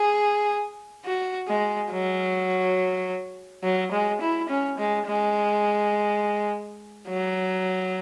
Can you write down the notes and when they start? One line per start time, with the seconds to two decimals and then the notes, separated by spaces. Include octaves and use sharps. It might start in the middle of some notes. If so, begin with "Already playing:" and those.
Already playing: G#4
1.05 F#4
1.48 G#3
1.91 F#3
3.64 F#3
3.92 G#3
4.21 E4
4.49 C#4
4.78 G#3
5.07 G#3
7.08 F#3